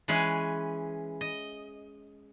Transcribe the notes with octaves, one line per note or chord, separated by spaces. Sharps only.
E3 G#3 C#4 G#4 B4
D#5